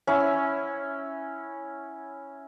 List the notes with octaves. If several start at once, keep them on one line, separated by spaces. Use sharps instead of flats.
C#4 E4 F#5 E6